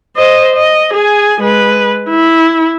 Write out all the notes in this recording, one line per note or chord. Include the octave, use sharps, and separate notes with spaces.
C5 D#5
D#5
G#4 G#5
G#3 B4
E4